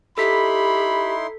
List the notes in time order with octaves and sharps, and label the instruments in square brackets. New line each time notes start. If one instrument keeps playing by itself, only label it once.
[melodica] D#4 E4 C6 [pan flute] G4 [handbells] A4 B6 [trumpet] B5